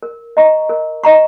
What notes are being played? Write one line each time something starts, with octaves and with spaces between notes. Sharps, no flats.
A#4
D#5 A#5 C#6
A#4
D#5 A#5 C#6